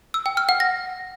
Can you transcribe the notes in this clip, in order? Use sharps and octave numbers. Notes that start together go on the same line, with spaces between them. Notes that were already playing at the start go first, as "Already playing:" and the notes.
E6
G5
F6
F#5
A#6